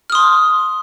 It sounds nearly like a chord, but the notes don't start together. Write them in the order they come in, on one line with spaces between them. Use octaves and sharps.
F6 D#6 C6